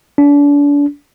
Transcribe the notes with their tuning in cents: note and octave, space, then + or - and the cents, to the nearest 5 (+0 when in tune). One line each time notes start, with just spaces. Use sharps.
D4 -35